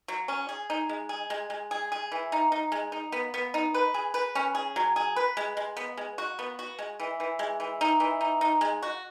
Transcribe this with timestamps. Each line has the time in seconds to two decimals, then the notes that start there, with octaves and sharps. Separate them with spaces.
0.08 F#3
0.28 C#4
0.49 G#4
0.70 D#4
0.89 G#3
1.09 G#4
1.30 G#3
1.50 G#3
1.71 G#4
1.92 G#4
2.12 E3
2.32 D#4
2.52 D#4
2.72 G#3
2.92 D#4
3.12 B3
3.34 B3
3.54 D#4
3.74 B4
3.94 G#4
4.14 B4
4.35 C#4
4.55 G#4
4.76 F#3
4.96 G#4
5.16 B4
5.37 G#3
5.57 G#3
5.77 B3
5.97 G#3
6.18 F#4
6.39 B3
6.59 F#4
6.79 G#3
7.00 E3
7.20 E3
7.39 G#3
7.60 E3
7.81 D#4
8.00 E3
8.21 D#4
8.41 D#4
8.61 G#3
8.83 F#4